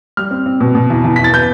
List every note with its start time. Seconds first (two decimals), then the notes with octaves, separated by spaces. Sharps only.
0.17 G3 F6
0.31 C4
0.46 C4
0.60 B2
0.75 B2
0.90 E2
1.04 E2
1.16 E2 B6
1.24 A6
1.33 B3 G6